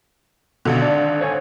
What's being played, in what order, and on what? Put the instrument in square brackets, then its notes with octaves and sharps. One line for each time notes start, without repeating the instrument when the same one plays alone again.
[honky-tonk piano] G#1 D3 [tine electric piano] B2
[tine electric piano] D4 D5
C5 C#5 G#5